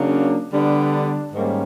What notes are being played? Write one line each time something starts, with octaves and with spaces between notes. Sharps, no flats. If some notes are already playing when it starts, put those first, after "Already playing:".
Already playing: C#3 F#3 A#3 D4
D3 G3 B3 D4
G#2 D#3 G3 A#3 C#4